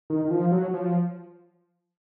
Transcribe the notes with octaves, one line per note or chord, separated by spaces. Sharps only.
D#3
D#3
F3
F#3
F3